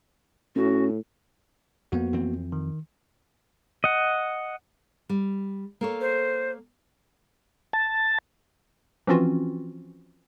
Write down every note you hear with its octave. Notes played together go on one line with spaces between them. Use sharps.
A2 C#4 F#4
F2 A#3 B3 F#4
F2 E3 C4
D#3
D#5 F#5
G3
A#3 A4 C#5
C5
A5
E3 F3 C4 C#4 F4 F#4